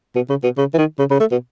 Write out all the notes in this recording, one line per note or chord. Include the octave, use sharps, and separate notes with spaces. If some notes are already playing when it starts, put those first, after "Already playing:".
B2
C#3
B2
C#3
E3
D#3
C#3
C#3
A3
B2